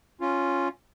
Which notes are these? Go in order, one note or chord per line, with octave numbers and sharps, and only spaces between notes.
C#4 F4